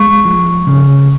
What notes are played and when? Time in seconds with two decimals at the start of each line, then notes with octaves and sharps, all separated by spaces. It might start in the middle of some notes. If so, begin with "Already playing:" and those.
Already playing: G#3 C#6
0.25 F3
0.67 C#3